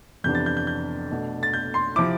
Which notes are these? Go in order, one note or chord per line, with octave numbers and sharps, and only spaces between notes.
F2 C3 E3 B3 D4 G6
A6
G6
G6
G6
B2 A3 D4
A6
G6
C6
C3 F3 C4 E4 D6